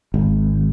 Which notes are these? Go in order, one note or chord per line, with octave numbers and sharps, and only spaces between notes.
G#1